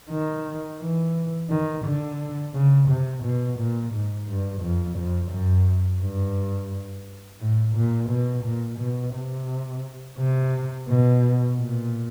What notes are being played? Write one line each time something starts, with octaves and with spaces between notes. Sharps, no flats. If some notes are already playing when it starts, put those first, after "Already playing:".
D#3
E3
D#3
D3
C#3
C3
B2
A#2
G#2
G2
F2
F2
F#2
G2
A2
A#2
B2
A#2
B2
C3
C3
B2
A#2